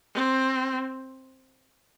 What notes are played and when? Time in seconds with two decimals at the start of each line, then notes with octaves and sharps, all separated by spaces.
0.15 C4